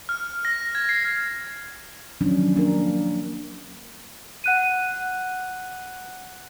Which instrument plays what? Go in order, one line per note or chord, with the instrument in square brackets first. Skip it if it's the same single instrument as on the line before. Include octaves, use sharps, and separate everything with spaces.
[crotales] F6
A#6
G#6
C7
[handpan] D#3 F3 F#3 C#4 D4
A#3 D4 A#4
[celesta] F#5 F#6 D#7